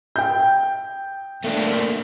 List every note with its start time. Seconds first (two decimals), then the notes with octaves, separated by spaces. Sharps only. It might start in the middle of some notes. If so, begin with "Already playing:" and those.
0.16 G5 G6
1.44 A3 A#3 D4